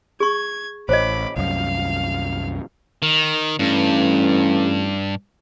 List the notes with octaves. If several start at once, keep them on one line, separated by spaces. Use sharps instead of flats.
G#4 C#6 G#6
A1 C5 C#5 D#5 B5 D6
C2 F#2 F5 F6
D#3
A1 G2